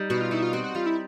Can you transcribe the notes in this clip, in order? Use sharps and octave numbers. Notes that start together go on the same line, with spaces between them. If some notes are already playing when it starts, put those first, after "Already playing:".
Already playing: G3 D#4
B2 F#4
F4
D#4 E4
F4
C4 F#4
F#4
G3 F4
E4